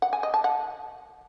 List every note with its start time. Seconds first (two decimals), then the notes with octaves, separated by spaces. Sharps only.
0.02 F#5
0.13 G#5
0.23 D#5
0.34 A5
0.44 F#5